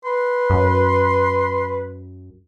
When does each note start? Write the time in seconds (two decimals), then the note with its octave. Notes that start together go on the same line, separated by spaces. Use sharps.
0.05 B4 C6
0.50 F#2